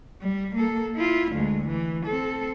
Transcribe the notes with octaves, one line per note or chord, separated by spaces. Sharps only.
G3
A#3 A4
E4 F4
D2 G#3
E3
C4 A4